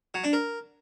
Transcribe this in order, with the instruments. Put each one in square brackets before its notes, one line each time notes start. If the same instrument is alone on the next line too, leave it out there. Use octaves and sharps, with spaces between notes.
[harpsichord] F#3
D4
A#4